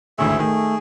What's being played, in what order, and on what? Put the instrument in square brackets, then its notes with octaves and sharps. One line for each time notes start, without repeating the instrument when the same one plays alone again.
[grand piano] G#1 D2 A2 [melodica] G#4 E5
[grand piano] D#3 [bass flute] A3 [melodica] G#4